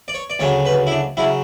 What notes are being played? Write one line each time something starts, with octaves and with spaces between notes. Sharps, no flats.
D5
C#5
D5
D2 C#3 F#3 C#5
B4
E4
D4
C#3 F#3 E4